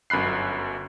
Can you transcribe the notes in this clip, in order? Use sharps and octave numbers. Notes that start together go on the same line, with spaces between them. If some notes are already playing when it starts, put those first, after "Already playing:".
G1 F#2 B5 F#6 C7